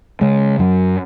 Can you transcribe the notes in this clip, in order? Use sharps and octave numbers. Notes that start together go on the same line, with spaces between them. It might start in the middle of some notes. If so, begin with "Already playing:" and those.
C#3 G#3
F#2 F#3